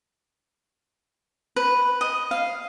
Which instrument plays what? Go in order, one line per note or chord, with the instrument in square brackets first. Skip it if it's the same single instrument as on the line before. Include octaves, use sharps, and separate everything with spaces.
[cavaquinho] B4
D#5
F5